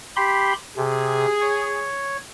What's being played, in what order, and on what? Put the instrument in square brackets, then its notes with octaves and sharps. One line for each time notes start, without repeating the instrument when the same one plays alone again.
[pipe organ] G4 B5 C6
[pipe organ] C3 [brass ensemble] G#4
[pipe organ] C#5